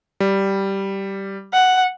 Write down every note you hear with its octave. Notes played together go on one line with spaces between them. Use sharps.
G3
F#5